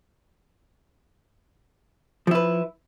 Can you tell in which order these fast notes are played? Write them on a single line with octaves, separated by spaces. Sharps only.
F3 E4 B4